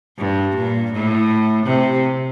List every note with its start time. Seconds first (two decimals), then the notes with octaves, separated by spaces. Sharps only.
0.18 G2
0.56 A#2
0.93 A2
1.66 C3